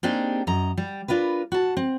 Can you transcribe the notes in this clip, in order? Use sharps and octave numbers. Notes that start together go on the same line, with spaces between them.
A#3 C4 D4 D#4 G4 G#4
F#2 D#5 A#5
G3
D4 F4 A#4 B4
F#4 A5
C4